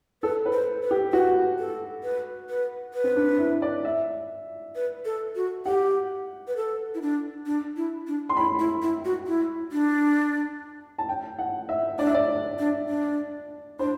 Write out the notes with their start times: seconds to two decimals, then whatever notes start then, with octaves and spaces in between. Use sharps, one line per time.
0.22 A4 B4
0.46 B4
0.52 C5
0.83 B4
0.91 G4
1.13 F#4 B4
1.59 A4
2.03 B4
2.49 B4
2.94 B4
3.04 C4
3.16 D4
3.39 E4
3.62 D5
3.85 E5
4.76 B4
5.05 A4
5.35 F#4
5.66 G4 F#5
6.48 B4
6.57 A4
6.94 E4
7.02 D4
7.46 D4
7.77 E4
8.07 D4
8.29 C6
8.37 E4 B5
8.59 E4
8.82 E4
9.05 F#4
9.27 E4
9.72 D4
10.98 A5
11.09 G5
11.39 F#5
11.69 E5
11.99 D4 D5
12.07 E5
12.14 D5
12.59 D4
12.89 D4
13.79 D4 C5